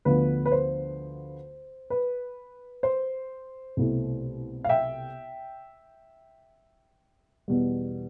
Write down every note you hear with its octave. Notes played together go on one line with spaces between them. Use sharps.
D2 D3 F3 B3 B4
B4
C5
B4
C5
C2 B2 A3 E4
F5
E5 G5
E2 B2 G3